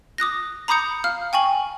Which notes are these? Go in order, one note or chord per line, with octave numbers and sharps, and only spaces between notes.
D6 D#6 F#6 A#6
A#5 B5 D6 D#6 G6 C#7
F5 F6
G5 G#5 C#6 F#7